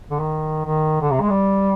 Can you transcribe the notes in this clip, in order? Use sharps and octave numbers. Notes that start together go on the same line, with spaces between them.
D3
D#3
D#3
D3
C3
G#3
G3